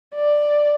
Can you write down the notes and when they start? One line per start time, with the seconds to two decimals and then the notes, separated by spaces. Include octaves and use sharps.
0.15 D5